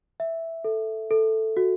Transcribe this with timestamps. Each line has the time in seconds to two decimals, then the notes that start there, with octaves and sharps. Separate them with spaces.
0.20 E5
0.64 A4
1.11 A4
1.57 F#4